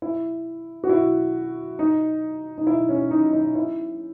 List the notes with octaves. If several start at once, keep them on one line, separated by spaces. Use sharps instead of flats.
E4
F#4
E4
D#4
D#4
E4
C#4
D#4
D#4
E4